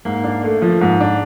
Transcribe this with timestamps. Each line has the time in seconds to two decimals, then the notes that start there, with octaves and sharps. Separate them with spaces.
0.05 G#2 A#3
0.24 D4
0.44 A3
0.62 F3
0.81 G#2
1.00 D4